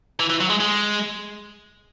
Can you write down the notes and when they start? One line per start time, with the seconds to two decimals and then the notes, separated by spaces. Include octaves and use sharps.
0.20 E3
0.30 E3
0.41 F#3
0.50 G#3
0.61 G#3